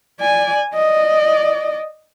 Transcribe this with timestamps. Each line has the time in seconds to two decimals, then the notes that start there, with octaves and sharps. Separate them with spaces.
0.20 D5 G#5
0.75 D5 D#5